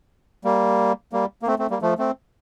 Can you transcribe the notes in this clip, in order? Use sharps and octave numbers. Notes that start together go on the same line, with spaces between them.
G3 A#3
G3 A#3
A#3
A3 C4
A3 C4
G3 A#3
F3 A3
A3 C4